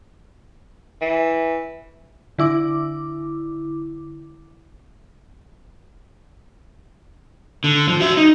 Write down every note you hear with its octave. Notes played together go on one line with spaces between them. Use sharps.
E3
D3 E4 D6
D3
F3
F#4 E5
D#4